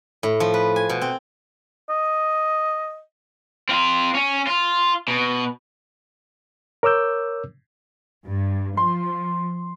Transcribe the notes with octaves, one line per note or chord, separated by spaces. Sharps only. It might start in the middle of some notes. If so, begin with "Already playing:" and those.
A2
F3
B4
G#5
B2
C4
D#5
C4 F4
C#4
F4
B2
A#4 C#5 D6 E6 G6
G2
F3 C6